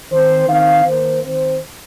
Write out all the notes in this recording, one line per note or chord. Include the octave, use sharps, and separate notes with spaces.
D#3 C4 C5
D#3 C4 F5
D#3 A#3 C5
D#3 C4 C5